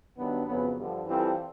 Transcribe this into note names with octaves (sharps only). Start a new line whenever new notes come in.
G2 D#3 F#3 B3 D4
F2 C#3 F#3 B3
G2 D3 F3
E3 G3 C4 F4 A4